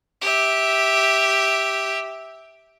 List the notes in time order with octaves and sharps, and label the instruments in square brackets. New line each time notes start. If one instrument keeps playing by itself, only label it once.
[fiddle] G4 E5